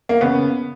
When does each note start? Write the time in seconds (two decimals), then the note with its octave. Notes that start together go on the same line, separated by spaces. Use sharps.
0.09 A#3
0.21 C#3 B3